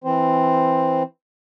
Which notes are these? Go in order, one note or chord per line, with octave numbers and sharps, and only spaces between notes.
E3 C4 C5